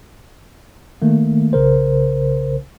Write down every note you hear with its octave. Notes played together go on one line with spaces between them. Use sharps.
D#3 A3 A#3
B1 C#3 A#4 C5